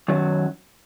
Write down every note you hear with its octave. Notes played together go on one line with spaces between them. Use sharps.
F#2 D#3 F#3